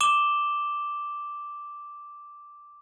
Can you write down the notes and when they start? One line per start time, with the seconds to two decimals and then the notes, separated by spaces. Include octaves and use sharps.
0.01 D6 E7 G7